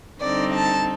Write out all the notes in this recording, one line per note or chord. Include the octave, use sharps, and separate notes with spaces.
D3 G3 C4 D#4 D5
A5